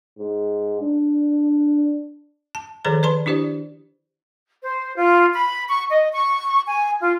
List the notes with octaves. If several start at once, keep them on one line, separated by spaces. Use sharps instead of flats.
G#2
D4
A5
D#3 F3 G#4 A4 C#5 A#5
B4 D5 A5 B5 C6
D4 E4 G4 C5 D5
C5
F4
B5
C#6
D#5
C#6
G#5
F4